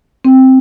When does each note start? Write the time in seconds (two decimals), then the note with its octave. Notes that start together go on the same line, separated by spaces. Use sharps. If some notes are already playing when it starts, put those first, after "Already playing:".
0.25 C4